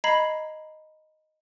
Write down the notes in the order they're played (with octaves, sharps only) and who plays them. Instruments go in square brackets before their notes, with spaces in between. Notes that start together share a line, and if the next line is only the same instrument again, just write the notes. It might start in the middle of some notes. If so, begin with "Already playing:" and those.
[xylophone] D#5 A#5 B5 G#6 C7 F#7